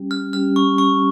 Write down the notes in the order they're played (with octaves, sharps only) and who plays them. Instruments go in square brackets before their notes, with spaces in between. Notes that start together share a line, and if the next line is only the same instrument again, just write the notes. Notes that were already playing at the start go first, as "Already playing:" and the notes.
Already playing: [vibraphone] G3 C#4 G4
[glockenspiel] F6
[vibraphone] G3 C#4 G4 [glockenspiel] F6
[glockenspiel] C#6
C#6